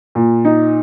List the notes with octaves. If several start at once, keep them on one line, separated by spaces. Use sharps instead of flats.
A#2
D#4